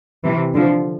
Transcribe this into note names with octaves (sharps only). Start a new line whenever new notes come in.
C3 E3
D3 F3